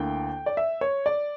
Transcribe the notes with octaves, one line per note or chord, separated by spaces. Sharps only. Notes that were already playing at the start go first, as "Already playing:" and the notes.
Already playing: D2 D3 A#3 E4 G5
D5
E5
C#5
D5